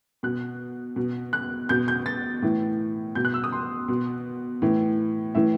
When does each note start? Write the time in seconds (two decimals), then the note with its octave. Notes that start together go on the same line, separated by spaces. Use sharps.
0.23 B2 F#6
0.96 B2
1.33 F#6
1.69 B2 G6
1.88 G6
2.06 A6
2.42 A2 E3
3.15 B2 G6
3.25 F#6
3.34 E6
3.44 D#6
3.52 C6
3.88 B2
4.62 A2 E3
5.35 A2 E3 E5